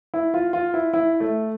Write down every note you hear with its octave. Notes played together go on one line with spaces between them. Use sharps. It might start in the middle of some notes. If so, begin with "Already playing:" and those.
E4
F4
F4
E4
E4
A3